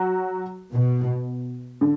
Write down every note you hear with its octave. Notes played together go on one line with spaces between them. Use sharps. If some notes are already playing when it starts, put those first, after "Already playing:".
Already playing: F#3 F#4
B2
D3